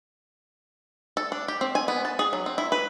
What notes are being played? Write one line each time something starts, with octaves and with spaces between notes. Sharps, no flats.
A4
D4
G4
C4
G#5
B3
A5
G#4
F#3
C4
E4
B4